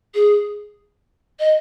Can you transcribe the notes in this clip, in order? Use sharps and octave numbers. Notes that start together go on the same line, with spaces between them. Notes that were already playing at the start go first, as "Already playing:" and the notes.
G#4
D#5